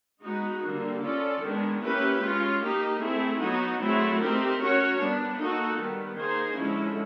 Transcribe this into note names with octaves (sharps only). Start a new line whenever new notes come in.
G#3 B3 D#4 F#4
D3 G3 A#3
C#4 F4 A4 D5
D#3 G#3 B3 D4
A#3 C#4 E4 G4 B4
G#3 C#4 F4
A#3 D#4 G4
A3 C4 E4 G#4
F#3 B3 D#4 F#4
F#3 A3 C4 E4 G#4
A3 C4 D#4 G4 A#4
C#4 F#4 A#4 C#5
G3 B3 D4
A#3 D#4 F#4 A4
D#3 G3 B3
A#3 D#4 G#4 C5
D3 F3 G#3 C#4 E4